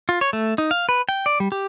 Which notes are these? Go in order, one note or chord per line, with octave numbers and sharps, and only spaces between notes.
F4
C#5
A3
D#4
F5
B4
G5
D5
G3
G4